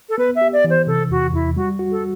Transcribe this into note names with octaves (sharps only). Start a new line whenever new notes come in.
A4
B3 B4
E5
G4
D5
E3
C5
C3 A4
E2 F#4
E2 E4
G3 F#4
F#4
A4